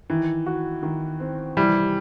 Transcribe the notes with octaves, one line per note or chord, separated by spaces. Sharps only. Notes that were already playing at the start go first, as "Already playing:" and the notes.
D#3 E3
F#4
D#3
C4
C3 E3 G3